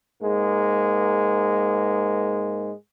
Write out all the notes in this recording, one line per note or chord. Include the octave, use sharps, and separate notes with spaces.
G#2 G#3 A#3